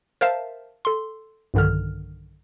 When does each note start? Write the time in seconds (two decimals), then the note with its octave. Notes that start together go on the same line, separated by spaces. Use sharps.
0.21 A#4 C5 E5 F5 A5
0.85 A4 C6
1.54 B1 G2 D3 D#3 F6